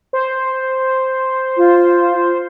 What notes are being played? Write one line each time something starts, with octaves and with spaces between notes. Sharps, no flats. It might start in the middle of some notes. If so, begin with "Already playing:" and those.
C5
F4